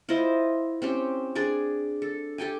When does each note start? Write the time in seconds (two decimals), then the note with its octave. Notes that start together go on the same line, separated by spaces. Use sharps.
0.09 E4 F4 C5 D#5
0.82 C4 C#4 G4
1.35 D4 G#4 D5 G#5
2.02 A4
2.38 G4 A4 G5 G#5